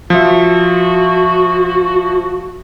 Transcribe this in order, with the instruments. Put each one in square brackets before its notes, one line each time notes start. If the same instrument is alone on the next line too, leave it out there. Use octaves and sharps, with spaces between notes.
[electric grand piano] F3 E5 [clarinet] F#4